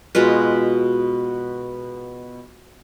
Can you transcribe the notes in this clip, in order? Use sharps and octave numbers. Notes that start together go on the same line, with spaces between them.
B2 G#3 F4 B4